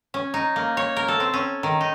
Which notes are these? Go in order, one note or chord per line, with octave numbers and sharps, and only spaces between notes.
C#4
D#4
A#3
C#5
A#4
A4
C4
C#4
D#3
D#4